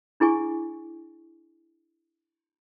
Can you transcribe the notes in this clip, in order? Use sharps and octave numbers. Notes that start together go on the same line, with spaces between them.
D4 E4 G#4 G#5 C#6